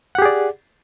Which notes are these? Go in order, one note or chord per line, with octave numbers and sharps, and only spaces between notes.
G4 G#4 D5 F#5